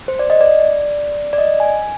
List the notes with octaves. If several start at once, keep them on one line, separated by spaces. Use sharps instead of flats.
C5
D5
D#5
D5
D5
D#5
G#5